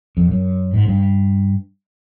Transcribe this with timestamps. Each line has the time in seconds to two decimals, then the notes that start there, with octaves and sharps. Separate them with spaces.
0.17 F2
0.31 F#2
0.74 G#2
0.88 G2